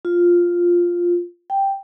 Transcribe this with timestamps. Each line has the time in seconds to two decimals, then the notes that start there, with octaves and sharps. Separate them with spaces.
0.05 F4
1.50 G5